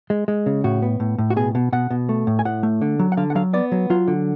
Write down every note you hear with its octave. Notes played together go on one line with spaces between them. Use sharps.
G#3
G#3
C#3
A2 F#4
B3
A2
A2
F#4
B2 G#4
B2
B2 F#5
B2
A3
A2
G#5
A2 F#5
A3
D3
F#3
F#5
D3 F5
F#5
F#3 F5
B3 D5
F#3
F#3 F4
D3